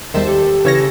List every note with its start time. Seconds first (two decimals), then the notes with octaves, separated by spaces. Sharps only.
0.14 E2 D#3 G3 C5 E5 A5
0.27 G4 A4
0.65 C#3 E3 A4 C#5 A#6